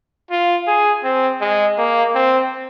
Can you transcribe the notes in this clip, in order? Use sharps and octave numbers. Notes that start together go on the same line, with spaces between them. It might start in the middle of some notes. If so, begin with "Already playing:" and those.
F4
G#4
C4
G#3
A#3
C4